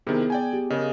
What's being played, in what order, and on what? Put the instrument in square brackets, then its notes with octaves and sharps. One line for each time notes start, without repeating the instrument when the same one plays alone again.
[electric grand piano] C3 D#3 E4 [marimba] B3 [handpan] G#4
[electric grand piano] D5 G5 G#5
[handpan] G4
[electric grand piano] C#3 [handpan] G#4 A#4 D#5